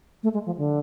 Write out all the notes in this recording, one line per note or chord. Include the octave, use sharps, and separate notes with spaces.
A3
G#3
F3
D3